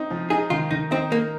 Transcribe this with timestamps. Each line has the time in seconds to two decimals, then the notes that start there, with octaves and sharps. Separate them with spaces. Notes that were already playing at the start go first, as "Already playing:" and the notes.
Already playing: C4 D#4
0.10 F3
0.30 D#4 G#4
0.50 D#3 F4
0.70 D#3 D#4
0.91 C4 D#4
1.12 A#3 A#4